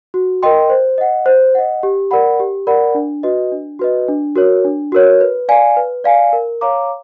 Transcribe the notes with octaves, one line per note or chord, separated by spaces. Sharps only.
F#4
A#4 D#5 G5 C6
C5
D#5 F#5
C5
D#5 F#5
G4
A#4 D5 F#5 B5
G4
A#4 D5 F#5 B5
D4
F#4 B4 D#5
D4
F#4 B4 D#5
D4
F#4 A#4 C#5
D4
F#4 A#4 C#5
B4
D5 F5 G#5
B4
D5 F5 G#5
A#4
C#5 F5 A#5 D6